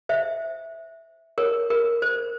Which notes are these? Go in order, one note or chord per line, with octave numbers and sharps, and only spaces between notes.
C5 E5
A#4 C#5
A#4
C5